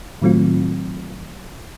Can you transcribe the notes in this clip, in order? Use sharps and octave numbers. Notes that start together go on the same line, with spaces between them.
A2 D#3 F#3 A3 C4 F4